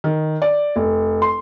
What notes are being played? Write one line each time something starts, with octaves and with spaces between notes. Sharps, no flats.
D#3
D5
F1
C6